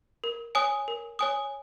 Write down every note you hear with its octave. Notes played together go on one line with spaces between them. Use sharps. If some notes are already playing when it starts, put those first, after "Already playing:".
A#4
C#5 G#5 D#6
A#4
C#5 G#5 D#6